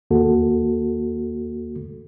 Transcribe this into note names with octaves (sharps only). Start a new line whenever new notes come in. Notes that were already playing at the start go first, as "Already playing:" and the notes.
D#2 A#3 F#4 A4